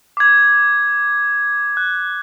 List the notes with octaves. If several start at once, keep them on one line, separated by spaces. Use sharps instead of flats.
D6 G#6
F#6